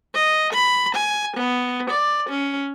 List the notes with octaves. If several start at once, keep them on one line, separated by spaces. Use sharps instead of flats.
D#5
B5
G#5
B3
D5
C#4